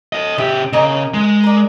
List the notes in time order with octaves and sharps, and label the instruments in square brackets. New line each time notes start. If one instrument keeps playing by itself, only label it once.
[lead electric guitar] A4 D#5
[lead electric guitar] C#3 G4 [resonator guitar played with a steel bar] E5
[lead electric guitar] C#3 [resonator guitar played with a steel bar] A#3 D#5
[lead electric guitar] G#3
[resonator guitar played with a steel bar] A#4 D5